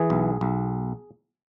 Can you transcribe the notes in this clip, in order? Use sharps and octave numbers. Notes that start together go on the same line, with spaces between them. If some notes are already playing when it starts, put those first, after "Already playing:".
Already playing: E3 G#4
B1
B1